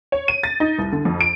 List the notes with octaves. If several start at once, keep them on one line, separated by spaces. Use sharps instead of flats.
C#5
D#7
A6
D#4
C2
D3
F2
D7